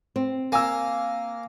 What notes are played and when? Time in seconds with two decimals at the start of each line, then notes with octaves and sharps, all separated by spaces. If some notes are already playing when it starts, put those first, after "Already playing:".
0.16 C4
0.52 A#3 G#5 E6